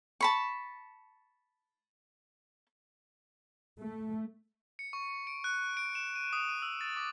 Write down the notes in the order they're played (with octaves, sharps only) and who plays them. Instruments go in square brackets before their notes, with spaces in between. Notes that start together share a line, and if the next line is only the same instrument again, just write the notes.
[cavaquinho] A5 B5 C#6
[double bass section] A3
[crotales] C#7
C#6
D7
F#6
D7
E7
D#7
D#6
D#7
E6
A6
D6